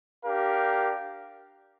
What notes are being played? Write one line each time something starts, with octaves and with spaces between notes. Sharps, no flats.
D4 G4 A#4 F5